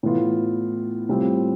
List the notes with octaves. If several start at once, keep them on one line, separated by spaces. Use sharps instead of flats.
A2 E3 B3 F4
A2 G3 C4 F4